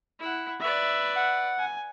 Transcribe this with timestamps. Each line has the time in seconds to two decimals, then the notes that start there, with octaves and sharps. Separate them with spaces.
0.19 E4 F#5
0.61 B4 D5 E5
1.16 F#5
1.59 G#5